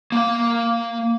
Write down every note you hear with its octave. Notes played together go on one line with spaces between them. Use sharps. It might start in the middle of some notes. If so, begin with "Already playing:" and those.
A#3 F5